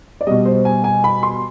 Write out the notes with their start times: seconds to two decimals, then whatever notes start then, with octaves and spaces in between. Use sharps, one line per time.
0.21 D5
0.27 B2 G3 D#5
0.45 C5
0.65 G#5
0.84 G#5
1.04 B5
1.23 C6